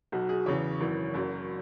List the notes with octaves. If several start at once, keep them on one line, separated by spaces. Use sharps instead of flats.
B1 B2 F#3 F#4
G#4
E2 C#3 E3 C#5
G#1 F#2 E3
F#1 F#2 F#3